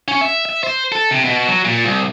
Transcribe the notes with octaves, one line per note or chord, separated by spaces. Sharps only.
C#4
E5
E5
C5
A4
C3
B2
F#3
A#2
C2